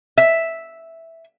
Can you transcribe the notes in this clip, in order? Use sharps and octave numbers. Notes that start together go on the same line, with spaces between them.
E5